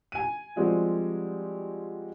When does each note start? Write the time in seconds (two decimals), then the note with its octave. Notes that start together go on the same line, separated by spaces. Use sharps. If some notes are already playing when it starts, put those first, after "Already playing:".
0.12 G#5 D#7
0.56 F3 G3 G#3 C4 F#4 C5